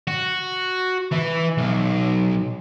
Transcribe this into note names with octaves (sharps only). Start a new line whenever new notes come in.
F#4
E3
B1